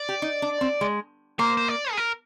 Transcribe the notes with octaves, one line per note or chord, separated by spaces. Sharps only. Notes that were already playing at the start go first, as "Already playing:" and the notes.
Already playing: D5
G4
D#4
D4
C4
G#3
A#3 C5
C5
D5
G#4
A#4